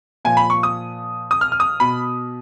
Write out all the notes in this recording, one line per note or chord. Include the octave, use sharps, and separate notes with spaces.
A#2 F3 G#5
B5
C#6
D#6
D#6
F6
F6
D#6
B2 B5